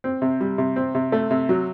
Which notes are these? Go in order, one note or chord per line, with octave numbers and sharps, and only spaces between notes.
C4
C3
G3
C3
C4
C3
A3
C3
F#3